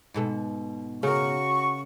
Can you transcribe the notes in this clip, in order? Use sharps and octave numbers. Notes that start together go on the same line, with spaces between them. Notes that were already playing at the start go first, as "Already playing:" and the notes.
G#2 B2 A4
C#3 F#4 A#4 C#6